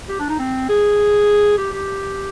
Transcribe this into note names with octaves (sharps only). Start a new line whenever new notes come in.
G4
D4
D#4
C4
G#4
G4
G4